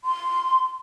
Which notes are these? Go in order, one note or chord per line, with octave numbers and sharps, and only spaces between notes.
C6